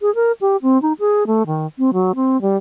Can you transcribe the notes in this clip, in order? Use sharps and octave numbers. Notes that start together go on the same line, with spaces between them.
G#4
A#4
G4
C4
D#4
G#4
A3
D#3
C4
F#3
C4
G3